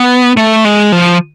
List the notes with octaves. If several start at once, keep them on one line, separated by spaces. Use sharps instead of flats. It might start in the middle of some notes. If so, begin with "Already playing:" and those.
Already playing: B3
A3
G#3
F3